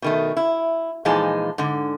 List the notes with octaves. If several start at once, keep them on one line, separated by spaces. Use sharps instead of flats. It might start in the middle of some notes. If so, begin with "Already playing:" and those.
B2 D#3 A3
E4
A#2 E3 F3 G#3 D#4 A5
G#2 D3